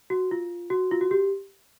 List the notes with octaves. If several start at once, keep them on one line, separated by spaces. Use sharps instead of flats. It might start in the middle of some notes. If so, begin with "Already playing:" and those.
F#4
F4
F#4
F4
F#4
G4